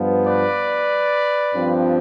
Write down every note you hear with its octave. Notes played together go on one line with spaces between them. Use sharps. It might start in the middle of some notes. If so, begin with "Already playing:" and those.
Already playing: G2 F3 B3
B4 D5
G2 F3 C4